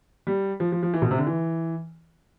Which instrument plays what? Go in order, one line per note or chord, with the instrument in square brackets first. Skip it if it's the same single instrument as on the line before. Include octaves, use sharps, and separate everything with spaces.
[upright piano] G3
F3
F3
F3
E3
B2
C3
D3
E3